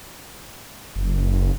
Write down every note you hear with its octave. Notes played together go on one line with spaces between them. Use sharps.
F#1